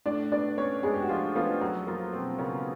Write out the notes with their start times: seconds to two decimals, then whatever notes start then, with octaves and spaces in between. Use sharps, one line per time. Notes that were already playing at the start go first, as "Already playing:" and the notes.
0.06 A2 D4 D5
0.32 B3 D4 D5
0.57 B3 C#4 C#5
0.83 G#3 B3 G#4
0.94 G4
1.02 F#4
1.09 F3 G#3 F4
1.36 F3 B3 F4
1.61 F#3 F#4
1.87 F3 A#3 F4
2.13 B2 C4
2.38 C#3 A#3 C#4